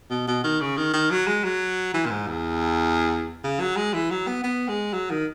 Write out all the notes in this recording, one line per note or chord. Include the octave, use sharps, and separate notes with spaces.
B2
B2
D#3
C#3
D#3
D#3
F#3
G#3
F#3
E3
A#2
G#2
E2
C#3
F#3
G#3
E3
F#3
B3
B3
G#3
F#3
D#3